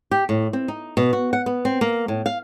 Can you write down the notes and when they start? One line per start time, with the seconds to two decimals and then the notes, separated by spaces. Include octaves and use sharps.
0.11 G4
0.29 A2
0.53 C4
0.68 D#4
0.97 B2
1.13 F#4
1.33 F#5
1.46 B3
1.65 C4
1.81 A#3
2.08 A2
2.26 F5